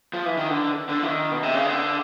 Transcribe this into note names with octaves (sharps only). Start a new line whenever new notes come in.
F3
E3
D#3
D3
D3
E3
D#3
B2
C3
C#3
D3